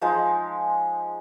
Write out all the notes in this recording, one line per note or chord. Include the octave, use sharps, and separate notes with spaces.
F3 G#3 D#4